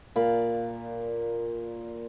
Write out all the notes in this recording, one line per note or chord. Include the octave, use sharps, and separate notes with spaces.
A#2 D5 F5 B5